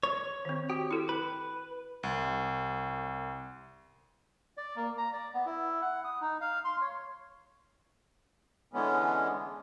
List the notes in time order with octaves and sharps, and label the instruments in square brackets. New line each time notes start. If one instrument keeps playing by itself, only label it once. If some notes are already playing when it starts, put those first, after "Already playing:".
[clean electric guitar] C#5
[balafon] D#3 C4
[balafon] F#4 [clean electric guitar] G4
[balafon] E4 A4
[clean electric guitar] B4
[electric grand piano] C2
[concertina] D5
A#3
A#5
D5
B3
E4
F#5
D#6
D#4
F5
C6
C#5
[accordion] D3 E3 G#3 B3 C#4